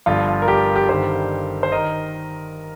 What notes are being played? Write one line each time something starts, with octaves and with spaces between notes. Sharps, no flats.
G1 G2 F3 F4
A#4
G4
G4
G1 G2 D#3 G4 C5
C5
D#3 A#4 D#5